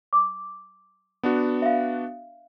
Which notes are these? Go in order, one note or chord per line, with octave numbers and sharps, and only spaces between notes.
D6
B3 D4 F#4
E5 F5